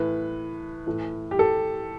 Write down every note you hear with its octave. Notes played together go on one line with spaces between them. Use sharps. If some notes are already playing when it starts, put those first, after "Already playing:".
Already playing: A2 E3 B4
A2 E3
G4
A4